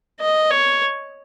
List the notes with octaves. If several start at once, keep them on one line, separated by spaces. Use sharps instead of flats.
D#5
C#5